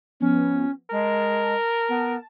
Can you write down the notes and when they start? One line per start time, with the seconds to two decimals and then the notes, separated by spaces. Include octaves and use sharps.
0.20 F3 B3 C#4
0.91 G#3 A#4 A5
1.89 B3